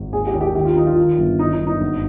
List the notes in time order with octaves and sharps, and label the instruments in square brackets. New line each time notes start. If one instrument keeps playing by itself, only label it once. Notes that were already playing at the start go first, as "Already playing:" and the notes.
Already playing: [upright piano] G#1
D#2 G#4
G4
D#2
G4
D#3 G4
F4
D#3 D#4
F4
D#3
G1
D#3 D#4
D#4
G1
D#4
G#1